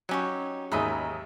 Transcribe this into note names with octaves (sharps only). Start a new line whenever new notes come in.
F#3 C#4 D#4 G4 C#5
D#2 G#2 G#4 D#5 E5 A#5 B5 D#6